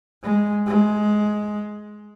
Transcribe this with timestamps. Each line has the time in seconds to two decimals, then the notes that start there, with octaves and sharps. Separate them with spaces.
0.23 G#3
0.66 G#3